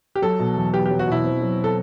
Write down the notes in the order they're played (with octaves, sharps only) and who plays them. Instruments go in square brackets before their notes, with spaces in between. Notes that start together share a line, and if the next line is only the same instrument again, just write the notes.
[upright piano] G4
[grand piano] F#3 [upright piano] A4
[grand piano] B2
E2
[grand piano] B3 [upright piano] G4
[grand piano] F#3 [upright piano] G4
[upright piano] F#4
[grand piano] B2 [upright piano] E4
[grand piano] C4
F#3
[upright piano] A4